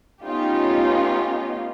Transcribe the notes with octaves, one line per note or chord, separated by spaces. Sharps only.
A3 B3 C#4 D#4 F4 G4